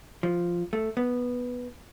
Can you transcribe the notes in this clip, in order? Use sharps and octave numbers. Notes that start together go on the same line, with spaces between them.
F3
A3
B3